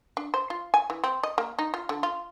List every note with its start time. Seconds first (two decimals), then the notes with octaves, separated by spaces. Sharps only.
0.17 D4
0.34 C5
0.50 F4
0.74 G#5
0.90 E3
1.04 C4
1.23 D#5
1.38 A#3
1.59 D#4
1.74 F4
1.89 D3
2.03 F4